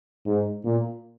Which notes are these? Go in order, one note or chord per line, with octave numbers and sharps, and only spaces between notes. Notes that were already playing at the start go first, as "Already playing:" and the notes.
G#2
A#2